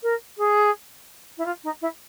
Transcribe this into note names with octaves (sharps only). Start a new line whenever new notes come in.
A#4
G#4
E4
F4
D#4
E4